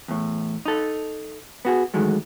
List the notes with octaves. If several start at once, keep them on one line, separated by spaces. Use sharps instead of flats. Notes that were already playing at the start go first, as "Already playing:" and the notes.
E2 A2
D#4 A4
B3 F#4 G#4
G#2 D#3 E3 F#3 G#3 A3